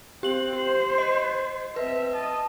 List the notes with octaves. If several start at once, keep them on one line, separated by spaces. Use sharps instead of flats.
C4 G4 F#7
C5
D#5
C4 B4 E5
D#5 A5